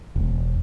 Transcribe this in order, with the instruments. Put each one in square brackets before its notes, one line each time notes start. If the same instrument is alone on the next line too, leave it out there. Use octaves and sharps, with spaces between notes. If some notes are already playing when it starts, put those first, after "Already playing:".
[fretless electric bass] E1